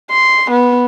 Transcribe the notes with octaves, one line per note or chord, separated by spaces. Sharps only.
C6
B3